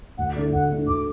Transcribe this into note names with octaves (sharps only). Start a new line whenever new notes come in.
D2 F#5
D3 A3 D4 D5
D2 F#5
D3 A3 D4
D2 D6